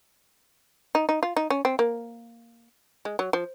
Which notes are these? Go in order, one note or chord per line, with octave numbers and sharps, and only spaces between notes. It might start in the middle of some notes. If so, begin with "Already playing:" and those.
D#4
D#4
F4
D#4
C#4
C4
A#3
G#3
F#3
F3